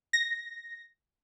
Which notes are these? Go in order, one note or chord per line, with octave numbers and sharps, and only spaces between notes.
A#6